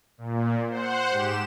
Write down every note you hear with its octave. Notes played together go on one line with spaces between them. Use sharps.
A#2
C5 F#5
G#2 G4 E7